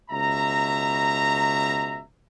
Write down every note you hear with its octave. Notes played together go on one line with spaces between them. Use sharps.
C#2 B2 E5 A#5